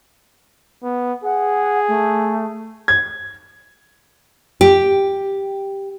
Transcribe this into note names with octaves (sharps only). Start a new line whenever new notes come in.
B3
G#4 F#5
A3
G#6
G4